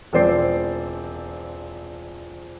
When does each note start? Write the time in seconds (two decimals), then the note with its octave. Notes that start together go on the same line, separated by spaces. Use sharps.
0.13 E1 F3 C4 C5 D5 C7